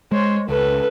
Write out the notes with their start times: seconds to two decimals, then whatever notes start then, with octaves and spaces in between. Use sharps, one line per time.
0.12 G#3 C5 C#5
0.48 C#2 A4 B4